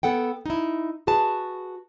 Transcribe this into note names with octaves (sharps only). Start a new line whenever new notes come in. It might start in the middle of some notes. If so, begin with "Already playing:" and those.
B3 A4 F#5 G5
D#4 E4
F#4 G#4 B4 A5